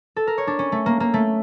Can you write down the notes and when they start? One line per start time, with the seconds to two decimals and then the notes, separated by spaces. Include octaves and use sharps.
0.16 A4
0.27 A#4
0.38 C#5
0.47 D4
0.59 C#4
0.72 A3
0.86 A#3
1.00 A#3
1.14 A3